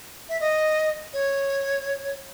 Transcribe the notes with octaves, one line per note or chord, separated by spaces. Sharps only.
E5
D#5
C#5